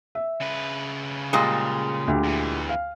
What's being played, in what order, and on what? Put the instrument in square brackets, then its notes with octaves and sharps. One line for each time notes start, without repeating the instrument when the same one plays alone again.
[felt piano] E5
[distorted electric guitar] C#3 B4
[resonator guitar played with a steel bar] A#2 G3 G#3
[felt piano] D2 G4
[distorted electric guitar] E2 E3
[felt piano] F5